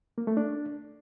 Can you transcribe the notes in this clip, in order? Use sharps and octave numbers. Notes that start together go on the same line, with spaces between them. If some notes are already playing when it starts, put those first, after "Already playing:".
A#3
A3
D4